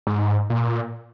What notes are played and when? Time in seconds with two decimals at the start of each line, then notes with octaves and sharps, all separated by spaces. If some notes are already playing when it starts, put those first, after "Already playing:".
0.07 G#2
0.50 A#2